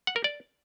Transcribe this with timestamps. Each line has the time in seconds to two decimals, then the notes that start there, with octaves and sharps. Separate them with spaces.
0.07 F#5
0.16 A#4
0.24 D5